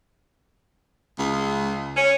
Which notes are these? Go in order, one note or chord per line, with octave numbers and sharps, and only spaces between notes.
C#2
C#4